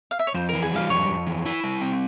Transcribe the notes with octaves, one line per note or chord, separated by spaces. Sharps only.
F5
E5
C#5
F2 C5
E3 A#4
G#4
G3 F5
F2 C#5
F2
E3
E4
G3
C4